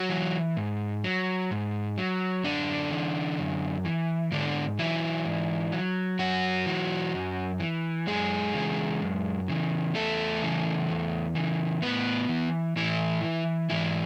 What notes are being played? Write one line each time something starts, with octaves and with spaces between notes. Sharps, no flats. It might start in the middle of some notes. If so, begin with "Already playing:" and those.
Already playing: F#3 F#4
E3
G#2
F#3
G#2
F#3
F#2 D3 D4
E3
F#2
E3
G#2 D3 D4
E3 F#3 E4
G#2
F#3
F#2 F#3 F#4
E3
F#2
E3
F#2 G#3 G#4
C#3 E3
F#2
C#3 E3
E2 A3 A4
C#3 E3
E2
C#3 E3
A2 B3 B4
E3
A2 E3 E4
E3
G#2 E3 E4